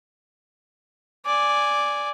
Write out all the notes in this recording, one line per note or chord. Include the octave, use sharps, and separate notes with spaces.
D5 G#5